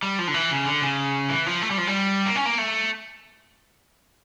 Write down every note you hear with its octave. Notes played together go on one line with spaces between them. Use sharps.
G3
F3
D3
E3
C#3
D3
C#3
E3
F3
A3
G3
F3
G3
A#3
C#4
A#3
A3